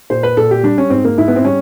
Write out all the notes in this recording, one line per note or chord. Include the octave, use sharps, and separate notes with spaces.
A#2 C5
B4
A#2 A4
G4
G3 D4
C#4
G#2 C4
A#3
G#2 E4
B3
C4
G3 C#4